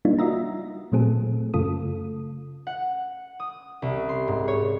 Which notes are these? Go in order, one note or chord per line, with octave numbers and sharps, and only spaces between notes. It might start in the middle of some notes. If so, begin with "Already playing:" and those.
G3 A#3 D4 D#4 F4
F4 F#4 D#5 E5 A#5
A#2 F#3 A3 C4 G#4 A4
F#2 C#3 A3 F4 A4 D#6
F#5
D#6
C2
C6
G#2
C#5